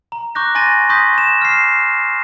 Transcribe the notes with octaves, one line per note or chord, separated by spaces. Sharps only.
A#5
C#6 D6 F#6 G6 A#6
G#5 C6 A6 A#6 D#7
C6 C#6 D#6 G6 A#6 B6
E7
F6 C7